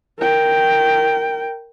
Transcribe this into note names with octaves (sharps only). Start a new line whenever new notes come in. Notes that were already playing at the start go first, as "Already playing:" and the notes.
A#4 G5